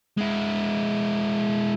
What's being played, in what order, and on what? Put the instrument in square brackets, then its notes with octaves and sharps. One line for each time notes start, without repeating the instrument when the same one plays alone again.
[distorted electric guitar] G#3 E4